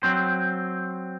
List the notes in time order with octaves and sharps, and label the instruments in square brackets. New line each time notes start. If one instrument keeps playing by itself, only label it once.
[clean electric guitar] F#3 C4 C5